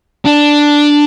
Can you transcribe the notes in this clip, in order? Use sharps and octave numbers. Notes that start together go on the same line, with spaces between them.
D4